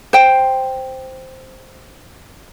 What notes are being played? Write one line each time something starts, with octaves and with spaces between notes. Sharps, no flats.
C5 G5